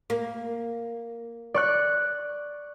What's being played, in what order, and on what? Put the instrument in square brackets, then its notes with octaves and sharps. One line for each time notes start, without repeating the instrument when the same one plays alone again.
[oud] A#3
[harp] D5 C#6 F#6